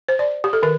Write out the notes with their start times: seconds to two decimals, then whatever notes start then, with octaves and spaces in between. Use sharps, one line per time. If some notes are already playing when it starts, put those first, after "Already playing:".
0.08 C5
0.19 D5
0.44 G4
0.53 A4
0.63 D#3 A#4